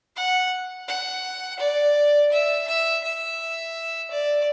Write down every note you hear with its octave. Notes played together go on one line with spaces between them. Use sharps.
F#5
F#5
D5
E5
E5
E5
D5